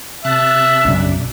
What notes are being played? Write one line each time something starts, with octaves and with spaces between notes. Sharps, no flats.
C3 E5 A5 F#6
B1 F#2 C#3 D4